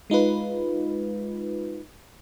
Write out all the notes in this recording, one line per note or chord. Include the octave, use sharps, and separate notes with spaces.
G#3 D#4 F4 B4